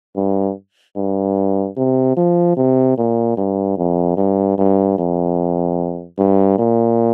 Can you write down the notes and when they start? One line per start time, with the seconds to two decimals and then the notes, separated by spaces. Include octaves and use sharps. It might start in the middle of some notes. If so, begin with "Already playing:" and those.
0.16 G2
0.96 G2
1.77 C3
2.16 F3
2.57 C3
2.97 A#2
3.37 G2
3.77 F2
4.17 G2
4.58 G2
4.98 F2
6.18 G2
6.58 A#2